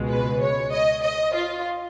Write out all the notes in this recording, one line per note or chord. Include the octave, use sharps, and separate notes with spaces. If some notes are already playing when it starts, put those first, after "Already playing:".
Already playing: C#2 B2 G#3
B4
C#5
D#5
D#5
F4